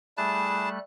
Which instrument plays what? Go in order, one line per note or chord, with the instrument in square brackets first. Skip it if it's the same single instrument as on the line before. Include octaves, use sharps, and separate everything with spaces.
[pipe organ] G3 A3 F#6 [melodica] E4 G#4 A5